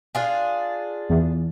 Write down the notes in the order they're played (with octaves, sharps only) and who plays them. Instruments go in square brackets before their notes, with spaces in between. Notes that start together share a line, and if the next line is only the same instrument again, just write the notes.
[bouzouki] D4 F4 G#4
[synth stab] E2